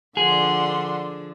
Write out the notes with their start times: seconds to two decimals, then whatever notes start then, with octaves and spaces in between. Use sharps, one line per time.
0.17 D3 F3 D4 G#4 F#5 C6